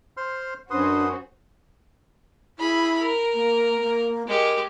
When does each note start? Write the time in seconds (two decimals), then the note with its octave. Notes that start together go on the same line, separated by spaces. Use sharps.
0.17 C5 C6 F6
0.71 F#2 C#4 D4 F#4 B4 C5 C6 D#6
2.59 E4 G#4 B5
3.00 A#4
3.34 A#3
3.83 A#3
4.27 G#3 G4 A#4